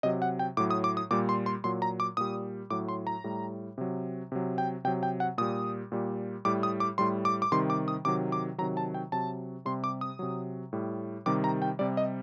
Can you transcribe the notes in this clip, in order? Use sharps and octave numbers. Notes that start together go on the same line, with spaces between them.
C3 F#3 D#5
F#5
G5
A2 F#3 D6
D#6
D6
D#6
A#2 G3 D6
C6
C6
A#2 F#3 C6
A#5
D6
A#2 G3 D#6
A2 F#3 D6
C6
A#5
A2 G3
C3 F#3
C3 F#3
G5
C3 F#3 G5
G5
F#5
A#2 G3 D#6
A#2 G3
A2 G3 D6
D#6
D6
A2 G3 C6
D6
D6
C3 D#3 G3 C6
D6
D#6
C3 D#3 F#3 D6
D6
C3 D#3 F#3 A#5
A5
G5
C3 F#3 A5
C3 G3 C6
D6
D#6
C3 F#3
A2 G3
C3 D#3 G3 D6
A#5
G5
C3 G3 D5
D#5